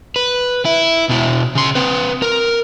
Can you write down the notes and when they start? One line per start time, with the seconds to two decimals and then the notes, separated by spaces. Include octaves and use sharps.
0.16 B4
0.65 E4
1.09 B2 E4
1.55 C#3 C6
1.75 C4 B4
2.22 A#4